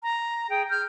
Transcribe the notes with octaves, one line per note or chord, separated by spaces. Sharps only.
A#5
G#4 G5
F6 G6